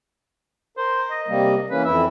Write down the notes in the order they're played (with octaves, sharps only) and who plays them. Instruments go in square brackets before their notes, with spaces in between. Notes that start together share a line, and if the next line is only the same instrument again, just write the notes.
[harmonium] A#4 [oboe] C5
[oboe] D#5
[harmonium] C3 G3 A#3
[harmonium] E3 A#3 C#4 [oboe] B4
[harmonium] F2 E3 E4 [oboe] E5